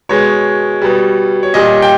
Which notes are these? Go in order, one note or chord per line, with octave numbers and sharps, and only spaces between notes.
B2 G#3 C#5
B2 G3
C#5
A#2 G3 D#5
G5